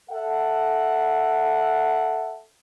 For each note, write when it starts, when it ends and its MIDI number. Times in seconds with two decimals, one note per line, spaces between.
0.11 2.38 69
0.11 2.38 76
0.11 2.38 78